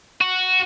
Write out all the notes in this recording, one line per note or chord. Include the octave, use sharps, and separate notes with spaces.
F#4